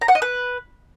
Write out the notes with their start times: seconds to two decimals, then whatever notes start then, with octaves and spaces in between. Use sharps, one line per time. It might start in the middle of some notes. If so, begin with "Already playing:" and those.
0.01 A#5
0.08 F#5
0.15 D#5
0.22 B4